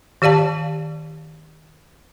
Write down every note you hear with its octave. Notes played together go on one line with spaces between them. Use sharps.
D#3 G4 D5 F5 A5